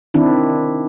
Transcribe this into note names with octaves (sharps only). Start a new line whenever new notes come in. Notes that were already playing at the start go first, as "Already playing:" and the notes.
D#3 C4 D4 E4